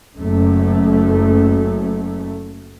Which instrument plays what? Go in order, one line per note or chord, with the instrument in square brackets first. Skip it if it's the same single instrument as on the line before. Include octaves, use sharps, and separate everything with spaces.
[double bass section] F#1 F#2 A3